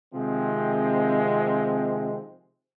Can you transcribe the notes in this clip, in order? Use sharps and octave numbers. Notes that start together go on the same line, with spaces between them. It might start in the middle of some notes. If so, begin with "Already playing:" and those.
C3 D#3 F3 G#3 C4